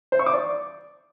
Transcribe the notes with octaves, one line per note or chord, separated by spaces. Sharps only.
C5
C#6
D6
D5